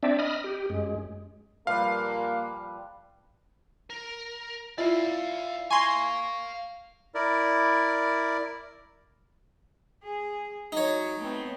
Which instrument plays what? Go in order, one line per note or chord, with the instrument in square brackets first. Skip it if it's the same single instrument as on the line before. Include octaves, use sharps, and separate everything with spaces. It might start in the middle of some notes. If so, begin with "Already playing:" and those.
[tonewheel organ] C4 D4 D5 E5
D#5 B5 D#6 F6
G4
F#2 G#3
[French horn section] A#2 A#3 [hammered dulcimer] F3 G3 B4 [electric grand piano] F5
[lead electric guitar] A#4
[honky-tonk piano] E4 F4 [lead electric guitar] D5 F5
[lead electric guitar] F5 A#5 [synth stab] G#5 C6 [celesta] C#6
[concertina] E4 A#4 D5
[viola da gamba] G#4
[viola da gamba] F#3 [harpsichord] D#4 C#5
[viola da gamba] A3 B3 C4